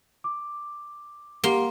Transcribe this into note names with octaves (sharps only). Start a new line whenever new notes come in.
D6
A#3 G4 F#5 C6